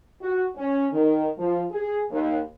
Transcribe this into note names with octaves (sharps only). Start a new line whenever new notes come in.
F#4
C#4
D#3
F3
G#4
D#2